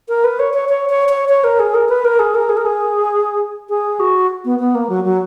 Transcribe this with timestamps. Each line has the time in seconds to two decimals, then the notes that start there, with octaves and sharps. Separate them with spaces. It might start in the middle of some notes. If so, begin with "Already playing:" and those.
0.09 A#4
0.24 B4
0.39 C#5
0.54 C#5
0.69 C#5
0.89 C#5
1.09 C#5
1.29 C#5
1.44 A#4
1.59 G#4
1.75 A#4
1.89 B4
2.05 A#4
2.19 G#4
2.35 A#4
2.49 G#4
2.57 A#4
2.66 G#4
3.69 G#4
4.00 F#4
4.45 B3
4.59 B3
4.75 A#3
4.89 F#3
5.04 F#3